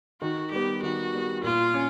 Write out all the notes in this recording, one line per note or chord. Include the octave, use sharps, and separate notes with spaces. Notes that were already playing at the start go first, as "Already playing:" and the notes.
D#3 F#4
G3 B3 G4
D#3 F#4
G3 B3
A#2 F4
C#4